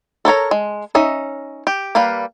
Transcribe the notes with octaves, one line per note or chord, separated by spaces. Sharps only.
A4 A#4 C#5 A#5
G#3
C#4 D#4 D#5 E5
G4
G3 A#3 B4 F5